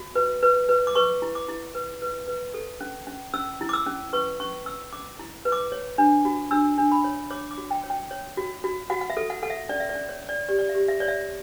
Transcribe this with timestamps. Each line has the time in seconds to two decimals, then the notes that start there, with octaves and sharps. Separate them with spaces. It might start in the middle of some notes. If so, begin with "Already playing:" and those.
Already playing: F#4
0.16 B4
0.43 B4
0.69 B4
0.87 D6
0.95 B4 C#6
1.22 E4
1.35 D6
1.49 E4
1.75 B4
2.02 B4
2.28 B4
2.54 A4
2.81 C#4
3.07 C#4
3.34 C#4 E6
3.61 E4
3.69 D6
3.73 E6
3.86 C#4
4.13 B4 C#6
4.40 C#4 C#6
4.66 C#4 E6
4.93 C#4 D6
5.19 E4
5.45 B4
5.52 D6
5.72 C#5
5.98 D4
6.25 F#4
6.51 D4 E6
6.78 D4
6.92 B5
7.04 C#5
7.30 C#5 D6
7.51 D6
7.58 F#4
7.71 G5
7.83 C#5
7.90 G5
8.11 C#5
8.37 F#4
8.64 F#4
8.90 F#4 F#5
9.01 F#5
9.10 E5
9.17 A4
9.30 F#5
9.43 A4 F#5
9.50 E5
9.69 C#4 D5
9.80 E5
9.89 D5
9.95 C#4
10.09 C#5
10.22 C#4
10.29 D5
10.48 G4 D5
10.59 D5
10.69 E5
10.75 G4
10.88 E5
11.00 C#5 D5
11.08 E5